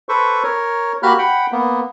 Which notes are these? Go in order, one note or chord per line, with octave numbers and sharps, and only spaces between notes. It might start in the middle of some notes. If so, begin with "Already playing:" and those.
A4 B4 C5 C#6
A#4 C#5
A#3 F#4 G4 B5 F6 F#6
F#5 G5 B5
A#3 B3